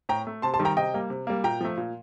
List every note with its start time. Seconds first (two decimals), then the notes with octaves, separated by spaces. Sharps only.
0.09 A2 G5 A#5
0.27 A3
0.42 C3 A5 C6
0.54 A5 C6
0.59 D#3 G3
0.65 G5 A#5
0.77 C3 D#5 G5
0.94 G3 A#3
1.10 C3
1.27 G3 A#3
1.44 A#2 G5 A#5
1.61 F3 A3
1.77 A#2